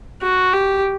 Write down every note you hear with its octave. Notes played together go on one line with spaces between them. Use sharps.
F#4
G4